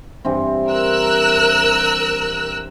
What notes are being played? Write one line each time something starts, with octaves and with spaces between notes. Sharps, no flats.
G2 E3 C4
A#4 E6 F#6